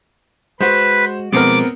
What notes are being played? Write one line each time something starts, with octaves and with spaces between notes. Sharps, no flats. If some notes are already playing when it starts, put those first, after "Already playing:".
G#3 F#4 B4 C5
B2 F3 G#3 B3 C4 A#4 D6